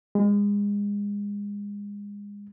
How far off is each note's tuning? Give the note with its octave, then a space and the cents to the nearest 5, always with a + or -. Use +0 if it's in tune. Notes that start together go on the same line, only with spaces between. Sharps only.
G#3 -30